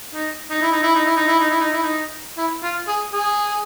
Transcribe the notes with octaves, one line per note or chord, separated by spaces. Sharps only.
D#4
D#4
E4
D#4
E4
D#4
E4
D#4
E4
D#4
E4
D#4
E4
D#4
E4
F4
G#4
G#4